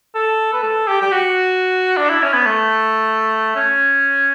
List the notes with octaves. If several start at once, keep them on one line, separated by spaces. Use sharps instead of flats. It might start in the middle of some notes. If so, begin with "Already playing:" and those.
A4
B4
A4
G4
G4
F#4
D4
E4
C#4
B3
A3
C#4